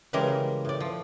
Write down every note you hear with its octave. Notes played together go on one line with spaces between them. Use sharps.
C#3 E3 G3 G#3 A#4
A2 D5
F3